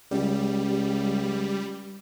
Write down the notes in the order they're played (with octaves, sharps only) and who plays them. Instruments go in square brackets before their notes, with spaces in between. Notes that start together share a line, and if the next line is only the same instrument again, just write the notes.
[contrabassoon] C#2 [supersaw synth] G3